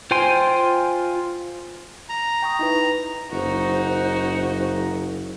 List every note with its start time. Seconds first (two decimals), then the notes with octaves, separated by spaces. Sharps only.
0.11 F4 C5 G5 G#5 C6
2.09 A#5
2.42 G5 C#6 D#6
2.59 D#4 E4 B4
3.32 F#1 D#4 F#4 C5